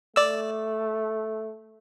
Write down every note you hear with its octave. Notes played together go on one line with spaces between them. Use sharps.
A3 D5 E6